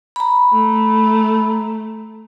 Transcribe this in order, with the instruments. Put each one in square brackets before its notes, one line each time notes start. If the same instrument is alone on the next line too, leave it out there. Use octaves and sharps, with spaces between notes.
[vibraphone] A#5 B5
[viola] A3